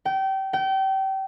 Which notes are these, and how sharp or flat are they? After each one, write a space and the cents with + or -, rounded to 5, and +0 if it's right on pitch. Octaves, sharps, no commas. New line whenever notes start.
G5 -25
G5 -30